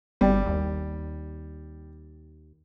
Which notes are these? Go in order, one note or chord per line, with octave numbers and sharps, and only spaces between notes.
G1 G3
D#2